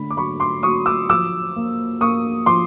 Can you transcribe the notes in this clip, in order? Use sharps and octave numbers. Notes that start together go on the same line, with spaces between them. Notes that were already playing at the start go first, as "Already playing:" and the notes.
Already playing: D3 A3 B5
D6
F#3 B5 C#6
C6 D6
F#3 C#6 D#6
D6 E6
F3 D6 E6
A#3
A#3 C#6 D#6
F3 C6 D6